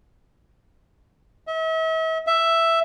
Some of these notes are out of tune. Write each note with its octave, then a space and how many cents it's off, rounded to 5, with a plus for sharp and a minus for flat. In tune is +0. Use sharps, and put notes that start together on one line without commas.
E5 -45
E5 +5